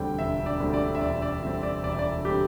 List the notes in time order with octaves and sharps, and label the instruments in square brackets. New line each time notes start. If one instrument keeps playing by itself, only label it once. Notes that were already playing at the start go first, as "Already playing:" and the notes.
Already playing: [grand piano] E1 D2 D3 G3 C4 G5
E1 E5
D5
D2 D3 G3 C4
D5
E5
E1 D5
D5
D2 D3 G3 C4 E5
D5
E1 D5
E5
D5
D3 G3 C4 G4